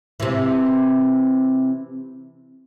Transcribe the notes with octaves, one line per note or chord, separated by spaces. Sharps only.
C3 E3